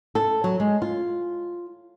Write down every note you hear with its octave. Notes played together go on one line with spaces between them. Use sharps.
A4
F#3
G#3
F4